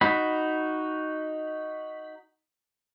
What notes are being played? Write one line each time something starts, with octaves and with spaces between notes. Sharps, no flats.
D#4 F#4 B5